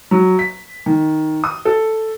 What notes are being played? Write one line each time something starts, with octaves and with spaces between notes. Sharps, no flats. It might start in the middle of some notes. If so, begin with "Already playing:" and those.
F#3
B6
D#3
D#6
A4